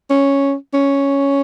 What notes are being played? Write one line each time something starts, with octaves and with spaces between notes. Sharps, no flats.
C#4
C#4